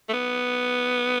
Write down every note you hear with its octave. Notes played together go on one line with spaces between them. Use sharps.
A3
B3